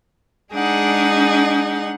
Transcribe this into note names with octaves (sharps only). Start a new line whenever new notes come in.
G#3 D4 D#4 G#4 F#5